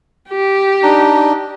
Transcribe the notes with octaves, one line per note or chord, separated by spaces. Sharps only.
G4
D4 D#4